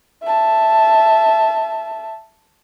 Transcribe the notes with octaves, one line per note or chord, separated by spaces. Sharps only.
E5 A5